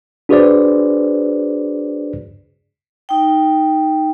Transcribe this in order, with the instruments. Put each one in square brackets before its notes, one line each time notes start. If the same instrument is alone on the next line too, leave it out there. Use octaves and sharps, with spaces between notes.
[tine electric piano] D4 F#4 G#4 B4 C5 D5
[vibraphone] D#4 G5